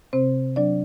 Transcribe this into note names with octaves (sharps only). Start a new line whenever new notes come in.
C3 C4 C5
F#3 D4 D5